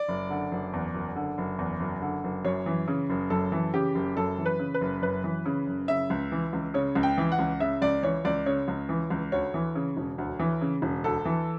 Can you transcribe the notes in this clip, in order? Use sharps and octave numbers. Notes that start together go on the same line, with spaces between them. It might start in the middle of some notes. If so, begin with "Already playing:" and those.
Already playing: D5
F#1
D3
F#1
E2
F#1
D3
F#1
E2
F#1
D3
F#1
F#2 C#5
E3
C#3
F#1
F#2 A4
E3
C#3 G4
F#1
F#2 A4
E3
B4
C#3
B4
F#1
F#2 B4
E3
C#3
F#1
C#3 E5
C#2
E3
C#2
C#3 C#5
C#2
G5
E3
F#5
C#2
C#3 E5
C#2 D5
E3 C#5
C#2 D5
C#3 C#5
C#2
E3
C#2
D2 C#5
E3
C#3
E1
D2
E3
C#3
E1
D2 A4
E3